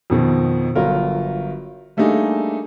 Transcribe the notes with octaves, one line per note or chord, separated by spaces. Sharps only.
F2 B2 D#3
G1 F#3 F4 A#4
G3 A3 A#3 D4 D#4 G#4